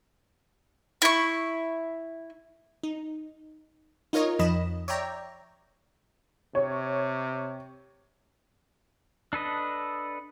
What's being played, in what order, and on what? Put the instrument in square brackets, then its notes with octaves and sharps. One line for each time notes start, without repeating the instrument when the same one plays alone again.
[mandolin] E4 C#6
[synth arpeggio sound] D#4
D#4 F4 A#4 C#5 D#5
F2 F3 D#5 B5 E7
C#5 D5 E5 G5 A#5
[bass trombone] C3 [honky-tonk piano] C#5
[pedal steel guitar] D4 A4 B4 D#5